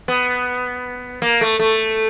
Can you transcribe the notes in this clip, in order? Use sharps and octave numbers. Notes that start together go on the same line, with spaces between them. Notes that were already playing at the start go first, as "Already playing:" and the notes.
B3
A#3
A3
A3